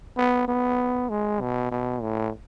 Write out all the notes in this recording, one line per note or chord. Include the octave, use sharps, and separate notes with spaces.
B3
B3
G#3
B2
B2
A2